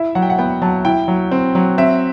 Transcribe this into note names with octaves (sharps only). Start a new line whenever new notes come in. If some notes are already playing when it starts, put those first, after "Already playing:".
Already playing: E4 E5
F#3 F#5
G5
F#5
B3 G5
F#3 A5
E4 G5
F#3
C4
F#3
C4 E5